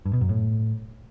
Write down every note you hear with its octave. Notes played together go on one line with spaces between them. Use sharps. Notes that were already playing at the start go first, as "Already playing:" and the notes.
G2
B2
F#2
A2